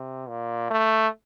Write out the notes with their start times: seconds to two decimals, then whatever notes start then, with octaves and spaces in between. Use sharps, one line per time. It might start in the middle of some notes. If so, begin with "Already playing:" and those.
Already playing: C3
0.28 A#2
0.71 A3